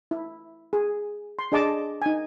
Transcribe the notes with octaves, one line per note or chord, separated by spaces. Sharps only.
E4
G#4
C6
D4 G#4 D#5 A5 D6
D#4 G#5